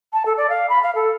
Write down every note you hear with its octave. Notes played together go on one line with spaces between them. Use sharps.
A5
A4
D5
F5
B5
F5
A4